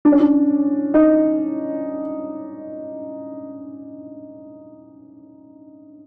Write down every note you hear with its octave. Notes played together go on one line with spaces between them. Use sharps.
D4
C#4
D4
D#4